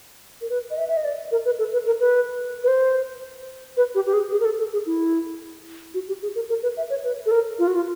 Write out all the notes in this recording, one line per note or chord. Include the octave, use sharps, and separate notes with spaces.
A#4
B4
D#5
E5
E5
D#5
D5
A#4
B4
A4
B4
A#4
B4
B4
C5
B4
G4
G4
G#4
G#4
A#4
A4
A4
G#4
E4
F#4
G4
G#4
A#4
A#4
B4
E5
C#5
B4
A4
A#4
F4
F#4
F4